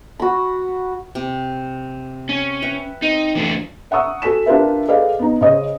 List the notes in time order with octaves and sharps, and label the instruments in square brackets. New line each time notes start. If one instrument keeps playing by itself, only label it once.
[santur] F#4 B5
[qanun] C3
[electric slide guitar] C#4
[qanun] B4 E5 G5
[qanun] C4 [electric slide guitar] D#4
[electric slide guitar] E3 A3 D4
[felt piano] E5 F#5 A#5 C#6 D#6 E6
F#4 A4 G#5 B6 E7
D4 F4 G4 A#4 B4 E5
G#4 A4 B4 D5 D#5 F5
B3 D#4
C#3 C#4 C5 D#5 D#6